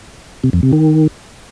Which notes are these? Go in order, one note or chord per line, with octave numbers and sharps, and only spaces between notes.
C3
F2
C3
D#3